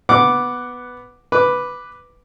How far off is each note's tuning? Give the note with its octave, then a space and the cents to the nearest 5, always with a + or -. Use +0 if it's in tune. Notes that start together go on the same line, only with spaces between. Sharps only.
B3 +0 F#5 +0 D6 +0
B4 +0 D6 +0